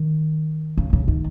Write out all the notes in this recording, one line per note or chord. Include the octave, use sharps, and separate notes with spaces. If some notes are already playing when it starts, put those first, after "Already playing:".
Already playing: D#3
C#3
C#3
D#3